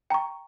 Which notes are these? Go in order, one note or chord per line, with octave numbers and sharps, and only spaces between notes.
G5 A#5 C#6